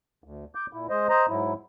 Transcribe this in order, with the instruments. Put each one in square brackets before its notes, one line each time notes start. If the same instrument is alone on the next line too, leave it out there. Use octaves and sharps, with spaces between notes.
[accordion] D2
D6 G6
A#2 E4
G#3 C5 D#5
C5 D#5 A#5
G#2 F#3 E4